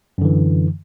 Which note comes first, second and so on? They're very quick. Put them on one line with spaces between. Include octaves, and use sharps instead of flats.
F#2 D3 E3